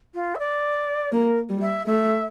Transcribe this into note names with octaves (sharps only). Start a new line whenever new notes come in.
F4
E5
D5
A#3 A#4
G3
E5
A3 E5